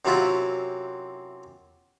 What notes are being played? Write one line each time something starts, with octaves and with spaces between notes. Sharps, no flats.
F#2 C3 F#3 C4 E4 F4